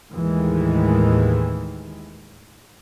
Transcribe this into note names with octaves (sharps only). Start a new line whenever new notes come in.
D#2 A2 D#3 E3 G#3